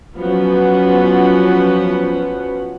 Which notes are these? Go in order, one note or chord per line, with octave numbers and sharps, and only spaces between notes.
F3 F#3 B3 C#4 B4 F#5